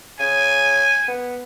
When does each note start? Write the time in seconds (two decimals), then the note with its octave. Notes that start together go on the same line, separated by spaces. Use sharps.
0.20 C#3 G#5
1.08 B3